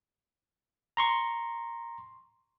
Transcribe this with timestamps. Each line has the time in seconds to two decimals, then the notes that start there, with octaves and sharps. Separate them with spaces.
0.97 A#5 C6 C#6